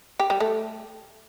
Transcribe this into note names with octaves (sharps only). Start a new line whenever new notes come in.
G4
G3
A3